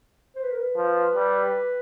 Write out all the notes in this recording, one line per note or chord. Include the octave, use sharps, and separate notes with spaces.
C5
B4
A#4
B4
F3
G3